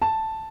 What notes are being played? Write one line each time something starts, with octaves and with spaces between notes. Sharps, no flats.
A5